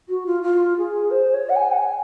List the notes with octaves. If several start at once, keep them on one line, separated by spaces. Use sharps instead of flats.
F#4
F4
F4
G#4
C5
C#5
F#5
G#5
F#5
G#5